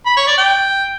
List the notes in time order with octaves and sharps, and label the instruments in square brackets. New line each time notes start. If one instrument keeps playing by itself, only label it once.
[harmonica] B5
C#5
D5
G5